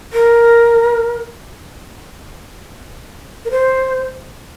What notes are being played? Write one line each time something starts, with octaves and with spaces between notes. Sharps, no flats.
A#4
A#4
C5